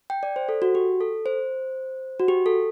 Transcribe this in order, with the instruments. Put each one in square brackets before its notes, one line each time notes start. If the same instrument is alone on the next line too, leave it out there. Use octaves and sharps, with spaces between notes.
[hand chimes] G5
D5
C5
A4
F#4
G4
A4
C5
F#4
G4
A4